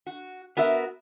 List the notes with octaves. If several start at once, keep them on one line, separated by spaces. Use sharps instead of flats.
F#4
B3 F#4 A#4 E5